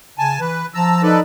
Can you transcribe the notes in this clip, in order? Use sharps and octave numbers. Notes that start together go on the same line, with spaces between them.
C#3 G#5 A5
E3 B4
F3 A5 A#5 E6
D#4 A4 B4 D5